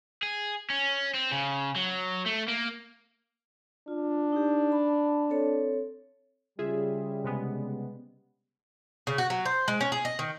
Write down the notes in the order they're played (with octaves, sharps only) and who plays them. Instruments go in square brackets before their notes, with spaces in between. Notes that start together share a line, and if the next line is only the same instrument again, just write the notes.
[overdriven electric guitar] G#4
C#4
C4
C#3
F#3
A3
A#3
[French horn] D4 [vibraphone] F4
[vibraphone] D#4 G4
A5 B5
C4 A4 C#5
[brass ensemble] C#3 G3 [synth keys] F4 G#4 E5
[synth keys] C3 G#3 B3
[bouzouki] C#3
F#4
F#3
C5
G#3
C#4
G#4
D#5
D#3